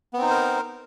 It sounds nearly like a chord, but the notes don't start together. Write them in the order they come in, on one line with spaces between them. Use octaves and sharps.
B3 C4 D#4 C5 A#4